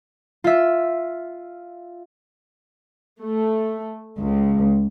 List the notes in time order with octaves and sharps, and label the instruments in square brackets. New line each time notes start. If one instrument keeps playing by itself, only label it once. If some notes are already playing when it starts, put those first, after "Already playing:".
[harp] F4 E5
[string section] A3
C#2